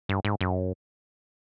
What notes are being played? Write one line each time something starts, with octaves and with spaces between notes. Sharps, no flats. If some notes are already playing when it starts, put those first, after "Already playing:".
G2
G#2
F#2